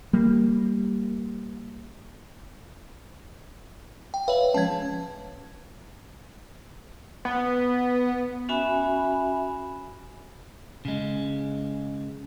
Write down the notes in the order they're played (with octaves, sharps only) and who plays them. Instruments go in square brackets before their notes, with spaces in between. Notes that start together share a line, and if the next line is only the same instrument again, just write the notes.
[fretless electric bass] G3 A#3
[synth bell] G5
[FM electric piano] B4 E5 [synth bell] C#5 F5
[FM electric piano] F3 G#3 C#4 [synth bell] A5 G#6
[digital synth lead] B3
[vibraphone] C#4 F#4 E5 G#5 B5
[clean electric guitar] C#3 G#3